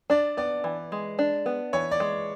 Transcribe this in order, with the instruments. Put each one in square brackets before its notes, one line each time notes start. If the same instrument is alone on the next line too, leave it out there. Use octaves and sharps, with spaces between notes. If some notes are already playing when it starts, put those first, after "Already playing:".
[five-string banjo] D4 [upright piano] D5
[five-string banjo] B3 [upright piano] D5
[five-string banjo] E3
G#3
D4
B3
[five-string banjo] E3 [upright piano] C#5
[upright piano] D5
[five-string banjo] G#3